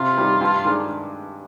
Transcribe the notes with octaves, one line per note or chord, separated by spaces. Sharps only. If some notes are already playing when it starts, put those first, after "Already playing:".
Already playing: C3 F4
D#3 G3
G2
D#3 G#3 D4